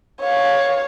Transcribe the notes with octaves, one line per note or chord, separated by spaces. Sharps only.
C#5 F5